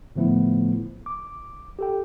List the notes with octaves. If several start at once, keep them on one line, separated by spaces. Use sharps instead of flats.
A2 D3 F3 A3 B3 E4
D6
G4 A4 G5